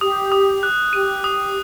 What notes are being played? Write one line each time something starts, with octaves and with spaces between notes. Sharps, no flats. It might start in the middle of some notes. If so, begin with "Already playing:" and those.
G4 D#6
D#6
F#6
G4 D#7
D#6